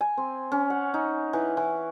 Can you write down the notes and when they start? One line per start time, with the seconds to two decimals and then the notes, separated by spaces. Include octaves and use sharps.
0.01 G#5
0.17 C4
0.52 C#4
0.70 F#5
0.94 D#4
1.33 E3
1.57 E3